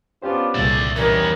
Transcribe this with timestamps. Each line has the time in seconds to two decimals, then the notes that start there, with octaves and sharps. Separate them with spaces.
0.22 B3 C#4 D4 F4 G4 C5
0.55 C2 F2 A#2 G#3 D5 E5
0.96 D#3 E3 G3 B3 C#4 A#4